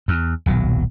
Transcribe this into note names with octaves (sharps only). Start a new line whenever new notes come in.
E2
D#1 B1 F#3